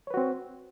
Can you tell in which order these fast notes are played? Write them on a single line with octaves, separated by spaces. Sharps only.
C#5 B4 F#4 C4